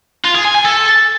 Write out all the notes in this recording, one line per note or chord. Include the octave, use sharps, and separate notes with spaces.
F4
G#4
G#5
G#5
A4